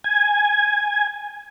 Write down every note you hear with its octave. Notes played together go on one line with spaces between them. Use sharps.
G#5